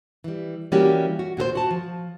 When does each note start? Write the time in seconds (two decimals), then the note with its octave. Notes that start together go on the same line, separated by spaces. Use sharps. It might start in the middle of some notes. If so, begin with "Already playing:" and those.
0.24 E3 G3
0.72 E3 G3 A#3 C#4 F#4 G4
1.19 F#4
1.37 A#2 F#4 A4 C5
1.55 F#4 A5
1.71 F3